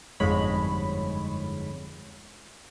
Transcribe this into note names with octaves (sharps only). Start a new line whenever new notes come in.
G1 F2 G#2 G#3 C#5 B5